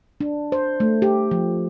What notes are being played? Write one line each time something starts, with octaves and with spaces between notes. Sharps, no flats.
D4
C5
A3
G4
F3